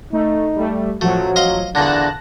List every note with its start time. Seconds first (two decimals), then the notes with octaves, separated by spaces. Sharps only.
0.13 A3 D#4
0.56 G3 A3
1.01 A1 F3 F#3 A3 F#4
1.36 D#5 F5 C6
1.75 E2 A#2 D3 D4 A5 F#6 A#6